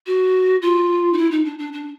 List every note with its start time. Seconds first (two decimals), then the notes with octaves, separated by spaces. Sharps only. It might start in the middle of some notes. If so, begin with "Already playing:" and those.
0.06 F#4
0.62 F4
1.13 D#4
1.17 E4
1.31 D#4
1.45 D4
1.58 D4
1.73 D4